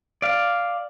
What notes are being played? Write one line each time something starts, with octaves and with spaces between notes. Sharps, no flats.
D5 F5